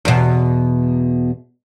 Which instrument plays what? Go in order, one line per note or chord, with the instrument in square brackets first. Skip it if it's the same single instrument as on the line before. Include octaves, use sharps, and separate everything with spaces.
[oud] E2 B2